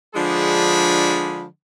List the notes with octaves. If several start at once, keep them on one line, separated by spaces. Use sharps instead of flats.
D3 F3 G#3 D4 G#4 B5